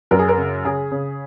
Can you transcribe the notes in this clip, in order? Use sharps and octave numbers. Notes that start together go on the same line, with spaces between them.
F#2 A#4
G#4
A#4
C#3
C#3 G#4
C#3